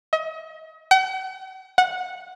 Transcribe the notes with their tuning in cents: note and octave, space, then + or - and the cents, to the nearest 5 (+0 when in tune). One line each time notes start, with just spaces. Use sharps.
D#5 +40
F#5 +45
F#5 -15